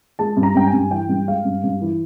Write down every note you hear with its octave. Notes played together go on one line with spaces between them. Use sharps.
G#3 A5
G2
A#5
G2 G5
G#5
G2
E3 G5
G2
G#3 F5
G2
G2
E3